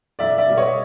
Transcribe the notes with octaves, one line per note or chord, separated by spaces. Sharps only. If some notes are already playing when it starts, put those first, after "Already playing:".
B1 D5 E5
D5 E5
B2 G3 B3
C#5 D#5